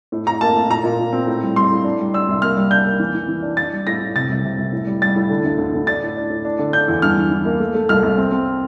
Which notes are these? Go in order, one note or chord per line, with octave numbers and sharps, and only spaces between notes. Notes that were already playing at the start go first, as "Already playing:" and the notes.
A2
A2 A#5
A#3 A5
A2
A#2 A#5
A#2
A#2
C4
A2
G3
G3 C6
A2
D4
G3
D4 E6
C2
A#3 F6
G3
D4 G6
A#3
E3
E3
E3
D4
D4 A6
G3
A2 A#6
A2
C3 A6
C2
C3
C2
A2
G3
G3 A6
A2
D3
D2
D2
D2
D4 A6
A2
D4
A2
D4
D3
D4 G6
E2
G2 F6
E3
E3
A#3
A3
A3
C2 F6
C2
C4
C4